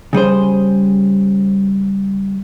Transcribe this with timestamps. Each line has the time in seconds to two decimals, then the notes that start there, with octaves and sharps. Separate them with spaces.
0.13 C#3 G3 G#4 C5